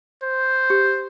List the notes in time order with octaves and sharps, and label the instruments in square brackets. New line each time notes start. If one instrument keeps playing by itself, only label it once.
[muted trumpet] C5
[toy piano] G4